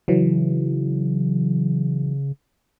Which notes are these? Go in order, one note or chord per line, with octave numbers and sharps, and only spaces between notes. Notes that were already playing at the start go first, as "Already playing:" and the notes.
C#3 E3 F#3